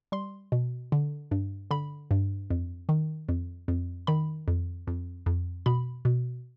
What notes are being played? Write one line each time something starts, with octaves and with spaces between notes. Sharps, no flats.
G3 C6
B2
D3
G2
D3 B5
G2
F2
D#3
F2
F2
D#3 B5
F2
F2
F2
B2 B5
B2